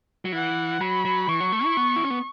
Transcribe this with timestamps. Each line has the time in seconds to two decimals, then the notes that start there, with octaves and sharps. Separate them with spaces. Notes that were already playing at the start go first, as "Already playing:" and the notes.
0.25 F#3
0.32 E3 F#5
0.81 F#3 B5
1.05 F#3
1.28 E3 C#6
1.41 F#3
1.52 A3
1.65 E4
1.77 B3
1.96 E4
2.03 C#4
2.10 B3